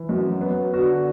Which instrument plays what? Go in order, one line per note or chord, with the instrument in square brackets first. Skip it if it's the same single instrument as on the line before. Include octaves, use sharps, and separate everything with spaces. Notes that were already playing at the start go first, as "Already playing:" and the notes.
Already playing: [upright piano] E3
[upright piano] F#2 [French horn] F#3
[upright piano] B3
[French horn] D3 [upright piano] F#4